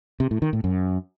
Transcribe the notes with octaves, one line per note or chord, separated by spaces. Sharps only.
C3
A2
D#3
A2
F#2